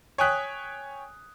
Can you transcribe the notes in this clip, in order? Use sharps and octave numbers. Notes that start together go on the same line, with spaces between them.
C#5 G5 G#5 D#6 F#6 B6